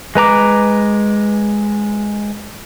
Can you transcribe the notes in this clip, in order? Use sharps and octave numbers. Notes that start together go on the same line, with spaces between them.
G#3 B4 A#5 D6